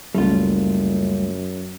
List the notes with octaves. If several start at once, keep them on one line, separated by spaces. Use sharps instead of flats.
F#1 C#2 F#2 G3 A3 F4